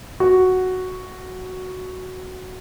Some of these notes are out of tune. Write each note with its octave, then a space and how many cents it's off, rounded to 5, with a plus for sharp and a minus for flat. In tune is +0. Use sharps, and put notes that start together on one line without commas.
F#4 +0